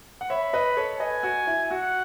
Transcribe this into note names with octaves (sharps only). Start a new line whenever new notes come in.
F#5
C#5 E5 B5
B4 D#5
A4 C#5
B4 D#5 G#5
F#4
E4
F#4 F#5